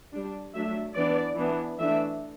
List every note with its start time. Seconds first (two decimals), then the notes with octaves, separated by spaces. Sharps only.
0.14 G3 D4
0.54 F#3 A3 D4 E5
0.96 E3 B3 D4 D5
1.37 E3 B3 D4
1.79 E3 A3 D4 E5